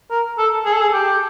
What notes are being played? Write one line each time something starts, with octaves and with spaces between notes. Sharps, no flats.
A#4
A4
G#4
A4
G#4
G4